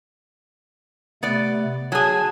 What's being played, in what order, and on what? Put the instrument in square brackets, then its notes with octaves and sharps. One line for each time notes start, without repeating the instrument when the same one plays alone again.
[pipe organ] C3 A3 [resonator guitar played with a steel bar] B3 D5
[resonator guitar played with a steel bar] F#3 G#4 [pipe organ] G#5 A5